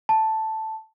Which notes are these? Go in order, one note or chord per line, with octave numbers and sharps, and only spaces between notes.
A5